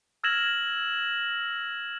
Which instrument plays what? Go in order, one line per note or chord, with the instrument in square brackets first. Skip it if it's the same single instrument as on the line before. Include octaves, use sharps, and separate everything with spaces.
[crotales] E6 F6 G#6 A#6 E7 F#7